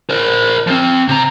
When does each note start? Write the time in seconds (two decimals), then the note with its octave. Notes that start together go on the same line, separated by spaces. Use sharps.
0.10 A#4 C5
0.67 F3 C4
1.09 C3 A#5